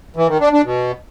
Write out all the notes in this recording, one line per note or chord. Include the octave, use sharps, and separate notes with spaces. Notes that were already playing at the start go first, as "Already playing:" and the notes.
E3
D#3
D4
D4
B2